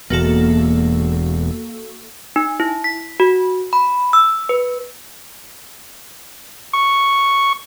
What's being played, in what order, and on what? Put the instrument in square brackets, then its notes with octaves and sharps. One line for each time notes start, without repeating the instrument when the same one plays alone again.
[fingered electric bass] E1 E2 [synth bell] A#3 F#4 A4
[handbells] D#4
E4
B6
F#4
B5
E6
B4
[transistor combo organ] C#6